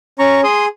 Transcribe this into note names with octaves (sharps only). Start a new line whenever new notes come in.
C#4 A#5 C#6
G#4 C6 D#6